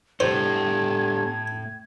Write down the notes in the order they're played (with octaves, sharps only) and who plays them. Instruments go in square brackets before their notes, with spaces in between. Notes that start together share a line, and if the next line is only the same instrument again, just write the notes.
[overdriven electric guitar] A2 [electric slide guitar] B3 G4 A4 [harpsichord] C5 [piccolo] G#6